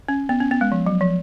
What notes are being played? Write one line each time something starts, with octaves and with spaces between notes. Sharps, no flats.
C#4
B3
C#4
B3
G#3
F3
F#3
F3